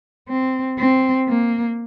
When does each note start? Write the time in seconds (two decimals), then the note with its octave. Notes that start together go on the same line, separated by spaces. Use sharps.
0.29 C4
0.78 C4
1.28 A#3